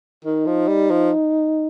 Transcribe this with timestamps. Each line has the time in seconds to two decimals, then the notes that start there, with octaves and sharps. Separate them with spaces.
0.24 D#3 D#4
0.46 F3
0.68 G3
0.91 F3